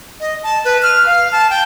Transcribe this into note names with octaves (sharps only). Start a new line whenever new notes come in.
D#5
A5
B4
F6
F5
A5
G5